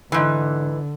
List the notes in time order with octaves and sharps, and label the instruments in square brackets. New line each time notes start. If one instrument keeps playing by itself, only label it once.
[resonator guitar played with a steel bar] G#2 E3 [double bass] D3